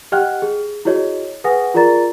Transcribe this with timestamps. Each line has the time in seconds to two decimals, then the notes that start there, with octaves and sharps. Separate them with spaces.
0.12 G4 D#5 F#5 G5 F6 F#6
0.42 G#4
0.85 E4 F#4 G#4 C#5 D#5
1.44 G#4 B4 F#5 G#5 D#6 A#6
1.74 F4 G#4 A#4 D5 A#5 A6